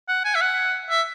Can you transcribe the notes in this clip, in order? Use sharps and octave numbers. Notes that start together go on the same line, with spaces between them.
F#5
G#5
E5
F#5
E5